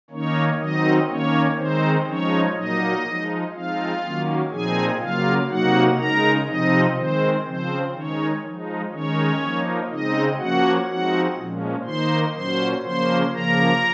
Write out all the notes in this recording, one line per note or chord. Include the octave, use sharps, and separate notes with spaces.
D#3 A#3 C#4 D#4 C#5
D#3 F#3 C4 D#4 D#5
D#3 A#3 C#4 C#5
D#3 G#3 C4 D#4 C5
F3 G#3 C#4 D#4 C#5
A#2 F#3 A#3 D#4 D#5
F3 G#3 D#4
F3 G#3 C4 D#4 F4 F5
D#3 F#3 A#3 C#4
A#2 F3 C4 D#4 G#4 G#5
C#3 F#3 A#3 F4 F5
C3 F#3 A#3 D#4 F#4 F#5
C#3 G#3 D#4 A#4 A#5
C3 F3 C4 D#4 D#5
D#3 G#3 C4 C5
C#3 F3 C4 C5
D#3 G#3 C#4 D#4 C#5
F3 G#3 D#4
D#3 G#3 C#4 D#4 C#5
F3 A#3 D#4
C#3 G#3 C4 D#4 D#5
F3 A#3 C#4 F#4 F#5
F3 G#3 C4 D#4 F#4 F#5
A#2 F3 G#3 C#4
D#3 A#3 D#4 C5 C6
A#2 F#3 C#4 C5 C6
C#3 F3 A#3 C#4 C5 C6
C#3 F3 A#3 A#4 A#5